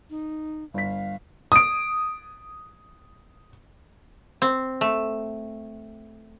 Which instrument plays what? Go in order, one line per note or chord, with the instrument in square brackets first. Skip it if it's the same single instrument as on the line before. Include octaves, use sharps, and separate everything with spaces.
[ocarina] D#4
[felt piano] G1 B6 [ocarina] F5
[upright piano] D#6 D7
[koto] C4
A3